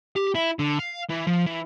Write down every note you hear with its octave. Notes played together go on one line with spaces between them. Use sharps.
G4
E4
D3
F5
E3
F3
E3